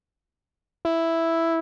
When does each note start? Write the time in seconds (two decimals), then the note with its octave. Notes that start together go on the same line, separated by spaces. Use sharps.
0.85 E4